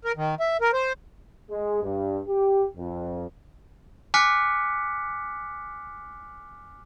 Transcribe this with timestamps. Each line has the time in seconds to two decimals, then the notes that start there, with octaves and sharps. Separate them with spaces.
0.05 A#4
0.16 D#3
0.40 E5
0.61 A#4
0.73 C5
1.50 G#3
1.83 G2
2.28 G4
2.77 F2
4.14 G#5 D6 F6 F#6 B6 C#7